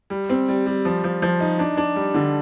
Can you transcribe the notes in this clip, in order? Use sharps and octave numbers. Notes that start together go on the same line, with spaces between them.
G3
C4
G3
G3
F3
F3
F3
D#4
D4
D4
G3
D3